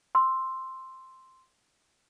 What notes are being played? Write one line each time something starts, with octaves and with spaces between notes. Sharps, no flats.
C6 E6